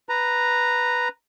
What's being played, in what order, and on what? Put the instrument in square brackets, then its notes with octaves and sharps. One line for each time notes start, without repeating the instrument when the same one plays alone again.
[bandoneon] B4 A#5